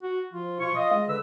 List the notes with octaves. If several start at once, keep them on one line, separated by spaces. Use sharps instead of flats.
F#4
F3 F4
B2 F4 C#6
D#5 F5
G#3
D3 B4 E6